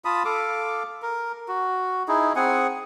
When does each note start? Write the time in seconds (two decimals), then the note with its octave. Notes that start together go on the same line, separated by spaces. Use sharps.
0.05 F4 A5 B5 D#6
0.25 A4 F5 D6
1.02 A#4
1.48 F#4
2.08 D#4 E4 G#4
2.36 C4 G#4 F#5 G#5